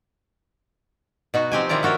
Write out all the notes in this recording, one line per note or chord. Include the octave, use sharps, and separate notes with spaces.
B2 D#4 F#4
F3 C4 G4 G#5
D#3 F3 C4 E4 D5 A#5
A#3 F#4 A4 A#4 C#5